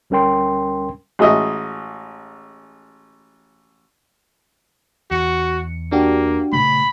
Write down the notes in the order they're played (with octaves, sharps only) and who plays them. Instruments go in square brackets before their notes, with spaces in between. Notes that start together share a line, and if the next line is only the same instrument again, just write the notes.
[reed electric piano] D2 G3 C#4 A#4 G5 C6
[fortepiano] A1 G#3 F#4 D#5 E5
[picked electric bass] E2 [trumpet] F#4 [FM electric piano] C#7
[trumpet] A#3 [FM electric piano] D4 F#4 G4
[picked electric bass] A#2 C#3 A3 [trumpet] B5